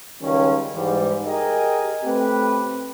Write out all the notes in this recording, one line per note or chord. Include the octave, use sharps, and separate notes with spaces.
C#2 D#3 G3 C#4
G#2 E3 G3
G4 G#4 A#4 D#5 G5 G#5
A3 C4 G4 B4